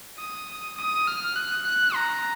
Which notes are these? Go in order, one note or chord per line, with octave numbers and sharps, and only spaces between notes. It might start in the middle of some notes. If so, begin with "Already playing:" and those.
D#6
D#6
F6
F#6
F#6
A#5